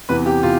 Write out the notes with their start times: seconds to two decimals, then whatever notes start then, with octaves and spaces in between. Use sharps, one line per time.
0.09 E2 C3 E3 B4
0.26 G4
0.43 C3 F4